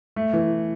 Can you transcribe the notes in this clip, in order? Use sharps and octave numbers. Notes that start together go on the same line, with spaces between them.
A3
E3